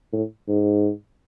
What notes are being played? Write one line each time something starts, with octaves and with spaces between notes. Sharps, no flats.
A2
G#2